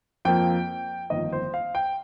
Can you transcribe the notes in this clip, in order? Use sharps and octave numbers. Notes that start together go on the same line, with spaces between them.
F2 F3 A#3 G5
G1 F2 D#3 A#3 D#5
C5
F5
G5